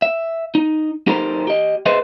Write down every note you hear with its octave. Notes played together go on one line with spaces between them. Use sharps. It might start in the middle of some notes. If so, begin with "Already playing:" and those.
E5
D#4
D#4 G4 A4 A#4 C5 A#5
G4 D#5
G#4 B4 C5 D#5 E5